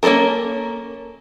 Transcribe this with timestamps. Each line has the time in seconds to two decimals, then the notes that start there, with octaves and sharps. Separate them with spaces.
0.03 A#3 C#4 F4 A4 A#4